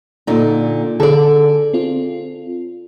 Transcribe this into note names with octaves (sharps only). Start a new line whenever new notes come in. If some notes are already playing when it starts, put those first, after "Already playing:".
A#2 D3 D#4
D3 G#4 A4 D5
C4 F4